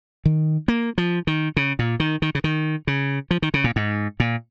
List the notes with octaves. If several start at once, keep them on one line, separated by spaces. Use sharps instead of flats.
D#3
A#3
F3
D#3
C#3
A#2
D#3
D#3
C#3
D#3
C#3
F3
D#3
C#3
A#2
G#2
A#2